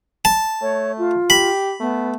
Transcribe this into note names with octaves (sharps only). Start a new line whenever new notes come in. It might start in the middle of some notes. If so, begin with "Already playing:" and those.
A5
A3 C#5
F4
G4 B5
A3 B3